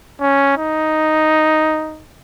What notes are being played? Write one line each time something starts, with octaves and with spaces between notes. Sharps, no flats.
C#4
D#4